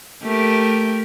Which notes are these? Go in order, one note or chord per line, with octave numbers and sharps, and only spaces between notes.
A3 G4 A#4